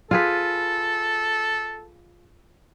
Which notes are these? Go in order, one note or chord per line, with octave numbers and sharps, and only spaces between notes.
F4 G#4 A4 B4